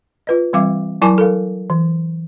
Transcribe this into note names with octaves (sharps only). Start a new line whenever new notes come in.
F4 B4 D#5
E3 G3 C4 E5 F5 D6
F#3 E4 A#4 G#5 A5 D6
A4 A#4 F5
E3